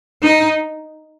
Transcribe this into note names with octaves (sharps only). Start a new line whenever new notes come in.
D#4